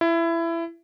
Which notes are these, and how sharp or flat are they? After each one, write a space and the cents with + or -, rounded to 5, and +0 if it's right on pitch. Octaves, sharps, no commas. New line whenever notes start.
E4 +20